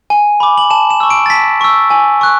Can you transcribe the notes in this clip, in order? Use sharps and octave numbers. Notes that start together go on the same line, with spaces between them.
G#5
B5 D6
F#7
A5 E7
E7
C#6 E6
D7
A6
A5 B6
C#6 E6
G#5
C#6 F#6